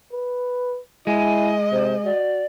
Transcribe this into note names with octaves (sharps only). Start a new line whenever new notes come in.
B4
G#3 E4 D#5 G#5
C3 C5
F#4 D5